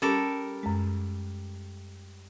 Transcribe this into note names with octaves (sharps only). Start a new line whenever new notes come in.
G3 C#4 G4 A4 A#4
F#2 G#3